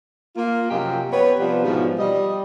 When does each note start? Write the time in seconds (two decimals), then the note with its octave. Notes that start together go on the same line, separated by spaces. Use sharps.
0.36 A#3 F4
0.71 F#2 C3 F3 F4 G4 D#5
1.12 B3 G4 B4 C#5
1.39 C3 F3 G3 B3
1.65 G#2 B2 E3 F3
1.99 G3 D#5